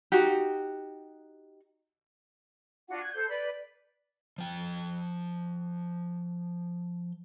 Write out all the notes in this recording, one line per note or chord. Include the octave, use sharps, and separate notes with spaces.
D#4 F#4 G4
D4 F4 F#4 F#5
F#6 G#6
A4 C5 G6
B4 D5 B5
F3 G5